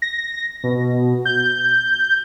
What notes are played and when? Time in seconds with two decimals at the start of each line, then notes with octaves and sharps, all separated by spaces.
0.02 A#6
0.64 B2
1.25 G6